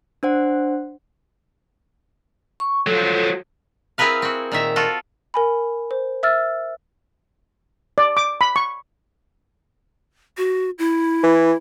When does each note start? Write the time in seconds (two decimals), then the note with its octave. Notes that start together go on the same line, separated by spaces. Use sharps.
0.23 D4 C5 F#5
2.60 C#6
2.87 F3 F#3 A4
3.98 C4 E4 G#4 A#4 B4 F5
4.22 C4 F#4
4.52 A#2 D#3 E5 A#5
4.76 F4 F#4 A4
5.34 A#4 G#5 B5
5.91 C5
6.23 E5 E6 F6 A6
7.98 D5
8.17 D6
8.41 B5
8.56 C#6
10.37 F#4
10.79 E4
11.23 E3